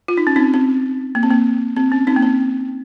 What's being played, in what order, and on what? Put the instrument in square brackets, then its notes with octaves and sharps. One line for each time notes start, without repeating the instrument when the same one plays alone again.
[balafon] F4
D#4
C#4
C4 D#4
C4
A#3
C4
A#3
C4
C#4
C4 D#4
A#3
C4